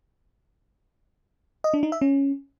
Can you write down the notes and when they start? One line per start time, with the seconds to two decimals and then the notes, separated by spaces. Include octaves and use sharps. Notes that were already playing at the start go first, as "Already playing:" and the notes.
1.64 D#5
1.74 D4
1.83 D#4
1.92 E5
2.01 C#4